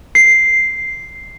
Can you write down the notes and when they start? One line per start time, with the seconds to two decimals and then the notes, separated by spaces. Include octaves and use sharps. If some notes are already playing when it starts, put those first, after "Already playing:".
0.15 C7